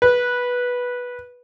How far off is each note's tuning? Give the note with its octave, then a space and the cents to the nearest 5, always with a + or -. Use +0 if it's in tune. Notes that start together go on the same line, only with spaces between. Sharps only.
B4 -10